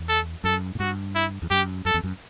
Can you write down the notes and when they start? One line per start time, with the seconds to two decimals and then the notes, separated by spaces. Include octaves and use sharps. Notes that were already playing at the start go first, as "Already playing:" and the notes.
Already playing: E2
0.09 A4
0.44 F#2 A4
0.75 A2
0.79 G2 F#4
1.15 E4
1.42 E2
1.50 F#2 G4
1.85 F#2 A4
1.94 E2
2.04 F#2